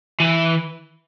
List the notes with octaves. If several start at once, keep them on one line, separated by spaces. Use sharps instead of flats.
E3